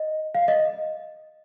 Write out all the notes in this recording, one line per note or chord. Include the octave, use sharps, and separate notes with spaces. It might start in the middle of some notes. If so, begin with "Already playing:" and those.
Already playing: D#5
F5
D#5